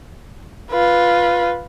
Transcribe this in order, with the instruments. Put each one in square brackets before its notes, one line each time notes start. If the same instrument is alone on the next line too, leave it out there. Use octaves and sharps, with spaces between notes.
[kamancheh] F4 B4